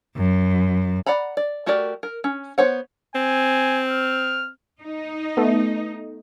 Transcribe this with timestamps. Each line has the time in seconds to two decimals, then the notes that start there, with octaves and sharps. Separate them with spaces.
0.17 F#2
1.06 D5 F#5 A#5 B5
1.37 D5
1.66 A3 F#4 G4 A#4 D5
2.03 A#4
2.24 C#4
2.58 B3 C5 C#5 F#5
3.15 C4 G#5
3.90 F6
4.83 D#4
5.37 A3 B3